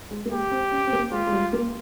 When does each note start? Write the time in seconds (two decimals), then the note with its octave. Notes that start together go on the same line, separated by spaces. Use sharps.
0.11 G#3
0.25 A#3
0.31 G#3 G4
0.51 C4
0.71 C#4
0.87 C4
0.93 A#3
1.12 G#3 F4
1.27 G#3
1.32 G3
1.53 A#3